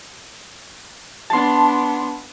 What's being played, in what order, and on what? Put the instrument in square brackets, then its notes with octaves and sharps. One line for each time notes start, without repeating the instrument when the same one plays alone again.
[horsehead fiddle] B3 D4 [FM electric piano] A5 C6